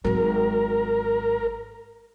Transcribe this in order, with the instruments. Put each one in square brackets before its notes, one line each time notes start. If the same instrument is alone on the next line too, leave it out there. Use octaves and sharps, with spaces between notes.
[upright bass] G#1 F#3 [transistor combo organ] A#4